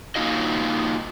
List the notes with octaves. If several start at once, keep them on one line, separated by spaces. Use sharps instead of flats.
A#3 D#4 F4 F#4 D#5